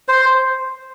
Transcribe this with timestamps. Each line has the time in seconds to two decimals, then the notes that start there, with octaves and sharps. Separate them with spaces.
0.08 C5